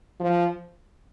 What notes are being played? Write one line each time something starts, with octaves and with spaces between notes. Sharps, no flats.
F3